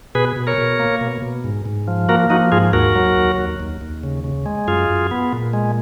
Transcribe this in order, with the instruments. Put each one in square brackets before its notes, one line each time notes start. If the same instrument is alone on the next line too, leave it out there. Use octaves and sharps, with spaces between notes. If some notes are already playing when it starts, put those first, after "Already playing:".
[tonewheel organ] B2 G#4 B4
B2
A#4 C#5
B2
A#3
B2
B2
G#2
G#2
F3
A#3 F#4 A#4
F3 D#4 F#4
G#2 F4 G#4
D#2 F#4 A#4
F#3
D#2
D#2
D#2
D#2
C#3
C#3
G#3
F#2 F4 G#4
F#2
B3
A#2
G#3